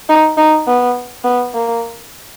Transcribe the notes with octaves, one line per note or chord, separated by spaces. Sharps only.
D#4
D#4
B3
B3
A#3